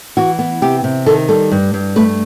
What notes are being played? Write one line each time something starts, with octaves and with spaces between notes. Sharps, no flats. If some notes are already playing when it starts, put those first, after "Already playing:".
E3 F#4
B3
C3 G4
C3
D#3 A4
G3 A4
G2
G2
A3 B4